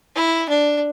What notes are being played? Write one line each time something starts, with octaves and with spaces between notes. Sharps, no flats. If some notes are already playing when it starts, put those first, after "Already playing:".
E4
D4